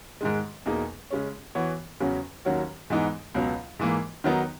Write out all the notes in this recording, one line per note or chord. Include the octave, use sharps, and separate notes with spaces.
G#2 D#3 G#3
E2 B2 A#3 D#4 G#4
C#3 G#3 C#4
E3 B3 F#4 C#5
E2 C#3 F#3 C#4 F#4
D#2 D#3 F#3 C#4 F#4
G#2 E3 B3 D#4
C#2 B2 F#3
G#2 E3 A#3
D#3 F#3 B3 D#4